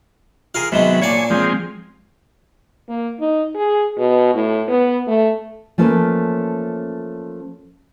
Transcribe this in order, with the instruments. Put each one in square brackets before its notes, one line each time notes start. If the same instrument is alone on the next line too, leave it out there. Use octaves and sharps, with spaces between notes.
[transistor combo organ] F4 [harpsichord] G#4 A#4 F5
[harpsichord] C3 D#3 G#3 [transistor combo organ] F#3 B3
[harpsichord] A#2 D4 D5 [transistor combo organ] C#5 G#5
[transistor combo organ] F3 G#3 C4
[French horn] A#3
D#4
G#4
B2
A2
B3
A3
[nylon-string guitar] F3 A3 A#3 C#4 B4